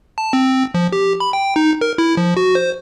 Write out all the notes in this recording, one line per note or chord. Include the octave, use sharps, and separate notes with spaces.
A5
C4
F3
G4
B5
G5
D#4
A#4
E4
F3
F#4
C5